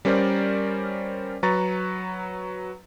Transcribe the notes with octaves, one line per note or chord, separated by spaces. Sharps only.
G3 C#4 A#4 C5 D5
F#3 B4 A#5 C#6 A6